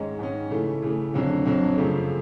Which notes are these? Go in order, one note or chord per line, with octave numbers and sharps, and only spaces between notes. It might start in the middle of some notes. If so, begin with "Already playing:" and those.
Already playing: G#2 D#3 G#3 C#4
G#2 D#3 G#3 C#4
C#3 E3 A3
C#3 E3 A3
F2 D3 F#3
F2 D3 F#3
F#2 C#3 F3 A3